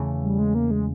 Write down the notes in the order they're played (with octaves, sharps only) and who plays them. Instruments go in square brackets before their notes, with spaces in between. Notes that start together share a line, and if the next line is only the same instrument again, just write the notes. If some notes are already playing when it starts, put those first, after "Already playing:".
Already playing: [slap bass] E2 C#3 E3 A3
[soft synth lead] G3
G#3
A#3
G#3